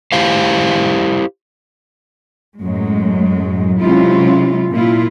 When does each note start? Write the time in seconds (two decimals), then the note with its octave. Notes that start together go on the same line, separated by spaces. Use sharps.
0.12 E4 G4 C5 F5
2.60 F#2 A2 F#3 G#3
3.79 C3 F#3 G#3 C#4 E4 F4
4.71 A#2 E4 F4